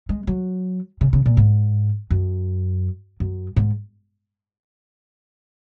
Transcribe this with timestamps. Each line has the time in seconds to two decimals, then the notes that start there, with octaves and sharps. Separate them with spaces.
0.09 G#3
0.27 F#3
1.01 C#3
1.13 C#3
1.26 A#2
1.37 G#2
2.10 F#2
3.20 F#2
3.56 G#2